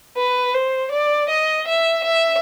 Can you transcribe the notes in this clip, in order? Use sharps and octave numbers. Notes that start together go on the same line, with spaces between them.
B4
C5
D5
D#5
E5
E5